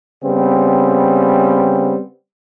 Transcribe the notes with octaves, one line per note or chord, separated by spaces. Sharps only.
C#3 G3 B3 C4